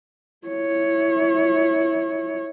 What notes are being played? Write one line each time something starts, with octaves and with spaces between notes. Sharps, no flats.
E4 C#5